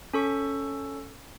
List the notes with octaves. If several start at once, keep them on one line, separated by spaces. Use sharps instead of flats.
C#4 A4 C#6